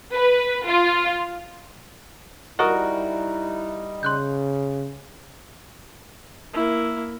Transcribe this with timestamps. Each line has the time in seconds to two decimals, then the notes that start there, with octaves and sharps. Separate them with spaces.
0.14 B4
0.67 F4
2.59 G3 D#4 E4 F#4 A#4 D#5 C#6 D#6
4.03 C#3 C6 F#6 G6
6.54 A#3 E4